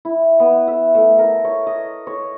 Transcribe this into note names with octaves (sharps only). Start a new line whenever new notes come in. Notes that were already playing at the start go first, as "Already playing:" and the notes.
E4
B3
E5
A3
A#4
C#5
D#5
C#5